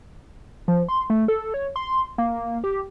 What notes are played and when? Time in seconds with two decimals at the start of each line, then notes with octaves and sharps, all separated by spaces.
0.68 F3
0.89 C6
1.10 A3
1.28 A4
1.54 C#5
1.76 C6
2.18 A#3
2.64 G4